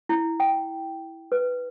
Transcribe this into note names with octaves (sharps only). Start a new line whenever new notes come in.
E4
G5
B4